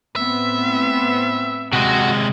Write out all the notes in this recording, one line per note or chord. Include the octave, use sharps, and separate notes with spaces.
A2 B3 C4 E5
C3 G#3 F#4